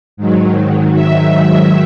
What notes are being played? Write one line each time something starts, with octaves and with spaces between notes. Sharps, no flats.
G#2 D#3 F#3
E5